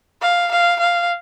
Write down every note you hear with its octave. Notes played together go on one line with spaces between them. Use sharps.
F5
F5
F5